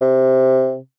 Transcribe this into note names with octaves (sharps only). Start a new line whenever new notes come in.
C3